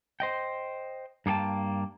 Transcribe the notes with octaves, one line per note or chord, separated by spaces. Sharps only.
C5 D#5 G5
G2 A#3 G#4 G5 A5